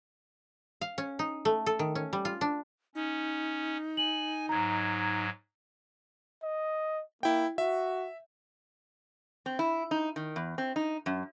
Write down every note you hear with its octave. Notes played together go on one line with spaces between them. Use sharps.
F5
C#4
D#4
A3
A4
D#3
C#4
G3
F4
D4
C#4 D#4
G#5 F#7
G#2 F#3 A#5 G#6
D#5
A#3 E4 G5
F#4 E5
C4
E4
D#4
D#3
E2
C4
D#4
F#2